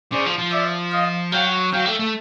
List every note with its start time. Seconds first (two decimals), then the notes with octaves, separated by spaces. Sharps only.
0.12 C#3 C5 D5
0.26 F3
0.38 F3
0.52 D5 E5
0.92 D#5 F5
1.32 F#3 F5 G5
1.73 F#3 F5 G5
1.86 A3
2.00 A3